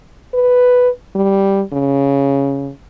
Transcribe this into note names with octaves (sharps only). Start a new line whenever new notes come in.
B4
G3
C#3